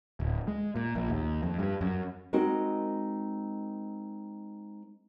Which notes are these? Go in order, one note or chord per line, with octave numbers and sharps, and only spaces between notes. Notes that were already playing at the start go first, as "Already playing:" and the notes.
D1
G#3
A#2
A#1
D#2
F2
G2
F#2
G#3 C4 D#4 F#4 A#4